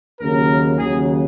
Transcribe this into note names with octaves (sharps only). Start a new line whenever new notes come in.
D#2 C#3 F#3 A#4
D#2 C#3 F#3 G#4